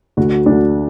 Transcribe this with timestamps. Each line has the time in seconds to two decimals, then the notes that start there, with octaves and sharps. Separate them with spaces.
0.17 D2 D3 F#4
0.46 D2 D3 D4